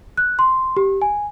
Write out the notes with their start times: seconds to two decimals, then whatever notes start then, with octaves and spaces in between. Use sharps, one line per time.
0.17 F#6
0.39 C6
0.77 G4
1.02 G#5